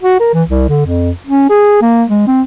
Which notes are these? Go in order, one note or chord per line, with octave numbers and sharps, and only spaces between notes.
F#4
A#4
E3
C2
D3
F2
C#4
G#4
A#3
G#3
C4